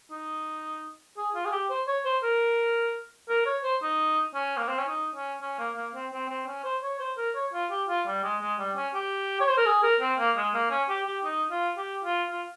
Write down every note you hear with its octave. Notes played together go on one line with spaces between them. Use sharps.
D#4
G#4
F4
G#4
G4
C5
C#5
C5
A#4
A#4
C#5
C5
D#4
C#4
A#3
C4
C#4
D#4
C#4
C#4
A#3
A#3
C4
C4
C4
C#4
C5
C#5
C5
A#4
C#5
F4
G4
F4
G3
G#3
G#3
G3
C#4
G4
C#5
C5
A#4
G#4
A#4
C4
A#3
G#3
A#3
C#4
G4
G4
D#4
F4
G4
F4
F4